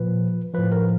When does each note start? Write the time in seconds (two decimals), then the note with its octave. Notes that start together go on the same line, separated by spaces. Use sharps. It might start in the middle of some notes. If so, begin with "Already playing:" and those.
Already playing: A#2 F3 B4
0.54 A2 F3 B4
0.72 A#4